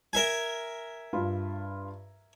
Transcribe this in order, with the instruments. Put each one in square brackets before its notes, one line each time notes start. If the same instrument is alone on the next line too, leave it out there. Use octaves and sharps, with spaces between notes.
[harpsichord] A#4 E5 G#5
[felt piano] G2 F4 B5